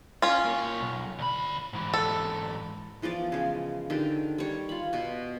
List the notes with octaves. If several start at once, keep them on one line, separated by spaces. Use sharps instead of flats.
C#4 F4
A#3 C#5
B1
D2 B5
G#2 E3
A4
E3 F3 B3 D5
C#3 G#3
D3 D#3 G4 A4
G3 C#5
F4 B5
B2 F#4